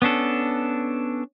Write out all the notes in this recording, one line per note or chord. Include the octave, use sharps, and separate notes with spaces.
B3 C#4 D4 A4